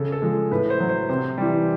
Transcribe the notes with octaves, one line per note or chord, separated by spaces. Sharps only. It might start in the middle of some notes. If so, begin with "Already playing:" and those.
Already playing: C#3 A4
A4
F3 G#3
A2 B4
C5
F#3
C5
C3 C5
E3 G3